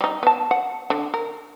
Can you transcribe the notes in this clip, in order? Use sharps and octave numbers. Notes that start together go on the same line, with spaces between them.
G3 D#4
B3 A5
F#5
D3
A#4